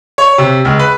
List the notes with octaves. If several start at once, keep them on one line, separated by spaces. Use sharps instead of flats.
C#5
C3
C#2
B4